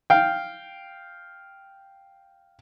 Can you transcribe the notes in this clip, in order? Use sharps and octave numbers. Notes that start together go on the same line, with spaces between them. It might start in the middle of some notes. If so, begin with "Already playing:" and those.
F5 G5